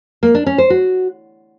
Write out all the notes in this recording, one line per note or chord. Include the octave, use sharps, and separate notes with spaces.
A#3
D4
C#4
C5
F#4